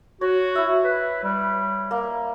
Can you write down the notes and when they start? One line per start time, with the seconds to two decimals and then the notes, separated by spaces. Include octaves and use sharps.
0.21 F#4 C#5
0.55 E4 E5
0.84 B4
1.24 G3
1.91 A#3